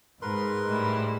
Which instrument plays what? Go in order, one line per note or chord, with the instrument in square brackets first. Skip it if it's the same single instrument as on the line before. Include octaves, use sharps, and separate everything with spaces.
[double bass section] G#2 [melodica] A#4 B4 C6
[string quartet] A2 G3 E4